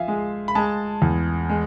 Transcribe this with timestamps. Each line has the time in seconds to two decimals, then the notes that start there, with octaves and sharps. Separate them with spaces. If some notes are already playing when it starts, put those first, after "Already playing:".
Already playing: F3 E5 F5 G#5
0.08 G#3
0.48 B5
0.55 G#3 A5
1.02 E2
1.50 G#3